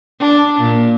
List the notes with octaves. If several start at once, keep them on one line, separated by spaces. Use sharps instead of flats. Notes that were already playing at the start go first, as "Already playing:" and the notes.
D4
A#2